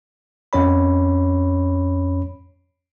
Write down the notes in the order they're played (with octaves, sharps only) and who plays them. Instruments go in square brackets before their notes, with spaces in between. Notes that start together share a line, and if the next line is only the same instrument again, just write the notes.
[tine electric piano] F2 C#4 C#5 B5